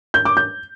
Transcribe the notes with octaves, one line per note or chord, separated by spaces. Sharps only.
G6
D6
G6